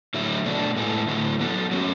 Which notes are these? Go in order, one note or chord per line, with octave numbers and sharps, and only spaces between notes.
D3 F#3 A3 E4
B2 A3 D4
A2 G#3 B3 E4 A4
D3 F#3 A3 E4 A4
F#3 B3 F#4 A4
F#3 A3 C#4 F#4